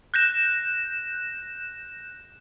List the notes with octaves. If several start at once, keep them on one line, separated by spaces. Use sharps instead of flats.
F#6 G6 A#6 E7